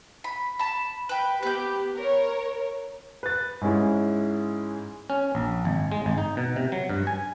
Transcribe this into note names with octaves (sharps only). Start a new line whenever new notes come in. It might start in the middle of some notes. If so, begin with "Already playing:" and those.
B5
A5 B5
B4 G5
B3 G4 B4 G6
A#4 C#5
B4 A6
G#2 G#3 C#4 E4
C#4
A#1
G#1
G#3
G#1
D#4
B2
C3
F#3
G2
G#5